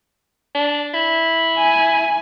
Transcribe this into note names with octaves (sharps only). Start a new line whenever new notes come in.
D4
E4
G#5